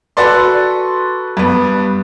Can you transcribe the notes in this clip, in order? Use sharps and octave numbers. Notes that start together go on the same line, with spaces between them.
F#4 A4 B4 D5 C6
G2 B3